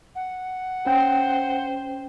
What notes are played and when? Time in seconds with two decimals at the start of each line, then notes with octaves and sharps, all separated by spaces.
0.15 F#5
0.86 C#4 C5 G5